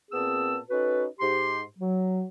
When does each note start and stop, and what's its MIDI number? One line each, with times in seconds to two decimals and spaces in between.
0.11 0.57 46
0.11 0.57 59
0.11 0.57 60
0.11 0.57 68
0.11 0.57 81
0.11 0.57 88
0.70 1.05 61
0.70 1.05 63
0.70 1.05 66
0.70 1.05 69
0.70 1.05 71
1.19 1.62 44
1.19 1.62 67
1.19 1.62 84
1.79 2.23 54